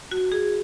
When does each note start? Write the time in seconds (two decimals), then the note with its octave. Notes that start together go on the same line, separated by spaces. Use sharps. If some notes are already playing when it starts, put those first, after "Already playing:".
0.11 F#4
0.32 G#4